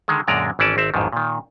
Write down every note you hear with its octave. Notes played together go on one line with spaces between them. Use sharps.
D3 D#3 G#3
F#2 A#2 D3 G#3 D5 A#5
G#1 E3 C#4 D5 A5
G#1 C4 E5
A1 F2 G#2 D#3
A#2 D#3